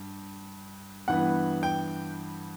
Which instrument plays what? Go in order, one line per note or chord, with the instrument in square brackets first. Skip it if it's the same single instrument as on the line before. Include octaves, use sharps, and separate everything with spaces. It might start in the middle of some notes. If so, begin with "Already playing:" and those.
Already playing: [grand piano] G2
G2 E3 B3 F#5
G5